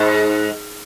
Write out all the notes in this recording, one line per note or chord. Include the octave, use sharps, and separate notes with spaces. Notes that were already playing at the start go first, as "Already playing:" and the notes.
Already playing: G#2